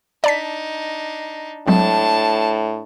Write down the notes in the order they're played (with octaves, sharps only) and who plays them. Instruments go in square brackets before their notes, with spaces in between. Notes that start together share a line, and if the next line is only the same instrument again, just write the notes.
[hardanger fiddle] D4 D#4 [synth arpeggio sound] D5 A5 B6
[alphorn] A2 [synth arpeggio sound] F#3 G#3 C4 [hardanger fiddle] D4 A5